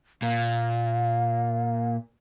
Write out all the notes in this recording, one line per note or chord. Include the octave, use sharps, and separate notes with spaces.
A#2 F5